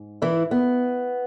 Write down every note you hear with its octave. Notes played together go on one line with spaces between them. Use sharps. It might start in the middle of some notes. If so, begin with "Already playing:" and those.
Already playing: G#2
E3 E4
B3